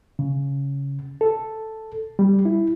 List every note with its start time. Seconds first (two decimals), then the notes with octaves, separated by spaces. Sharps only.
0.19 C#3
1.21 A4
2.19 G3
2.45 E4